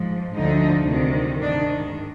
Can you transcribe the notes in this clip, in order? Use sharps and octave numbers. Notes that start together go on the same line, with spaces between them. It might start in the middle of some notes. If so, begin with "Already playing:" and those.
Already playing: G#2 F3
D2 D3 F3 D#4
D2 C3 D#3
G#2 D#3 D4